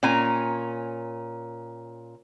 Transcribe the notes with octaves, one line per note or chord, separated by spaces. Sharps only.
A#2 C#4 G#5 A#5